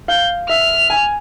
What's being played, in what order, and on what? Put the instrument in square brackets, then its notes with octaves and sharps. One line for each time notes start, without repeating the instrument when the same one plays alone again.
[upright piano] F5 [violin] G6
[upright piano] E5 [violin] F6
[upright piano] G#5